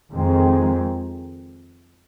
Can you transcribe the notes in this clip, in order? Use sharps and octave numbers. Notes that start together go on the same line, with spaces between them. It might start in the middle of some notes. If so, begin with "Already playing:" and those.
F2 D#3 G#3 C4